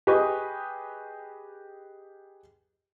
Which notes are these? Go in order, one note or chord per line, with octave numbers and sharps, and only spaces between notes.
G4 G#4 B4 D#5 C#6